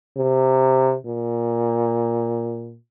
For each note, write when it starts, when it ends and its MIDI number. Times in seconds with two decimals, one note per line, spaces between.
0.17 0.96 48
1.06 2.77 46